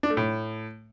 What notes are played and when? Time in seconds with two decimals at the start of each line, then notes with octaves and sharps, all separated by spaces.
0.03 D4
0.10 A3
0.17 A2